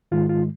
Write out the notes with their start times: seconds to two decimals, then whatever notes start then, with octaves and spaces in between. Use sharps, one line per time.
0.11 G#2 D#3 G#3 F4
0.29 F4